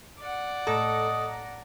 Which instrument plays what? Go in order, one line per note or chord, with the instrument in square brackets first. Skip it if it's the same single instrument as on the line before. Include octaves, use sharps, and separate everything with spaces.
[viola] D5 F#5
[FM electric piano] A2 A#5 A#6 [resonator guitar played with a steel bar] A4 [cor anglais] D#5